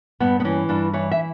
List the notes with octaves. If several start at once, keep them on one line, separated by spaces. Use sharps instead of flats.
G2 B3
B3
E3 C#4
G2 D4
E3 C#5
E5